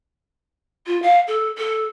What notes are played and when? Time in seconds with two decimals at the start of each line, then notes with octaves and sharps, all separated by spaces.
0.87 F4
1.02 F5
1.28 A4
1.58 A4